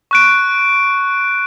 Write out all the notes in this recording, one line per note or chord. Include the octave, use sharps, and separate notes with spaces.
C#6 F#6 D7